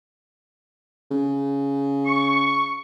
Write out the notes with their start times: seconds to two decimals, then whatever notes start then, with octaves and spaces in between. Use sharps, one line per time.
1.11 C#3
2.06 C#6